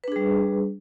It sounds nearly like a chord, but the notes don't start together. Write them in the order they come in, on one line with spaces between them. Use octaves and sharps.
B4 D4 G#4 G3